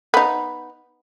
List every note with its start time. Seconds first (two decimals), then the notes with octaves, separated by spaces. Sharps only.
0.14 B3 D#4